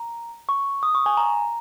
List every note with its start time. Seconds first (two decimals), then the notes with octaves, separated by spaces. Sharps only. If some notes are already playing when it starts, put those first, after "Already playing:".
Already playing: A#5
0.49 C#6
0.83 D#6
0.95 C#6
1.06 G#5
1.17 A#5